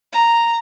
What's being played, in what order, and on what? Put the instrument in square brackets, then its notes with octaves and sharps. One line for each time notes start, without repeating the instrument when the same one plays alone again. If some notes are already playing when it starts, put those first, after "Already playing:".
[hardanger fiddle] A#5